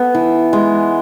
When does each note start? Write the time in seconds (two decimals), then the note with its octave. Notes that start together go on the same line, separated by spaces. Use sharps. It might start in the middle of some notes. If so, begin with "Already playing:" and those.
Already playing: B3 A4
0.15 E3
0.53 G#3